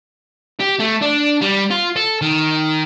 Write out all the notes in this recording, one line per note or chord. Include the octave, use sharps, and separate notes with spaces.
G4
A3
D4
G3
F4
A4
D#3